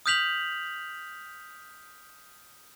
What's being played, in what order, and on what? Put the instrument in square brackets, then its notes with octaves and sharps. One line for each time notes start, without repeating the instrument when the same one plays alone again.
[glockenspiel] D#6 F6 G6 B6 F7 F#7